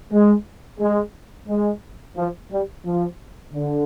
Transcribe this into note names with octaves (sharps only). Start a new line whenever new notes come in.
G#3
G#3
G#3
F3
G3
F3
D3